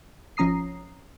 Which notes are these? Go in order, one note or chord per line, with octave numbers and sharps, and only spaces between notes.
G#1 F3 C#4 A#5 D#6 C7